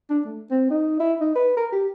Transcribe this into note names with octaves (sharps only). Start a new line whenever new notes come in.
D4
A3
C4
D#4
E4
D#4
B4
A#4
G4